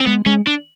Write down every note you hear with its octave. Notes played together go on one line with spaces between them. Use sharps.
C4
G#3 B3
G#3 C#4
D4